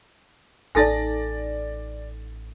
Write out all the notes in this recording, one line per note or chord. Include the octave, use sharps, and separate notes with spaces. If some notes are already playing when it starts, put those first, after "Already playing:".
A1 D#4 A4 D5 G#5 A6 A#6